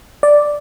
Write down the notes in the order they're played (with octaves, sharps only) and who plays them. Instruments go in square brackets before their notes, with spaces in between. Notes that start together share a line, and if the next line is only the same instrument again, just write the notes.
[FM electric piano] D5